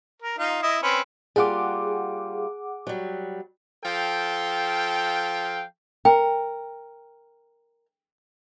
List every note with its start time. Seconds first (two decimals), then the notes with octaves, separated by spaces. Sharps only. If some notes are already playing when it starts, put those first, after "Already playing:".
0.22 A#4
0.38 D#4 F4
0.62 E4 D#5
0.83 C4 C#4 B4
1.36 G3 A#3 F4 G#4 F#5 D6
2.87 F#3 G3
3.84 F3 A4 F5 G5
6.05 A#4 G5